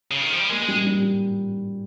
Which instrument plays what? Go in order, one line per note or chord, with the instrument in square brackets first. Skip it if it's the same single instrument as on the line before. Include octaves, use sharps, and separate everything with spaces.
[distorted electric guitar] C#3
D#3
F3
G3
[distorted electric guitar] G#3 [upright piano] A#3
[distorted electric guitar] G#3
[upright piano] G3
G3